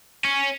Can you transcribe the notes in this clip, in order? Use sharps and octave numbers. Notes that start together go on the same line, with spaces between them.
C#4